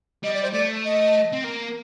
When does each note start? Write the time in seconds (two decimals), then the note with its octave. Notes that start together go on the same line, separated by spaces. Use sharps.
0.23 G3 D#5
0.34 D5
0.42 C5
0.52 A3 D5
0.84 D#5
1.33 C4
1.44 A#3